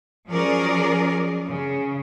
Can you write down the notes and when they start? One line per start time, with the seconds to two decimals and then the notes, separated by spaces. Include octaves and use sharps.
0.29 F3 F#3 C#4 G#4 A#4 D5
1.48 C#3